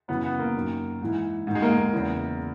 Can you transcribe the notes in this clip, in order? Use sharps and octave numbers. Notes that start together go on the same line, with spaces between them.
F#2 C#3 E3 B3
B3
A#3
F#2 D#3
G#2 E3
G#2 D#3
G#3
A#3
A#3
E2 C#3 E3